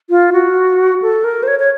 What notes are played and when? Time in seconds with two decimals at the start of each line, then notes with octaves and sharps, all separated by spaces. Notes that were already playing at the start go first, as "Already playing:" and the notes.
0.10 F4
0.33 F#4
1.02 A4
1.24 A#4
1.43 C5
1.48 C#5
1.59 C#5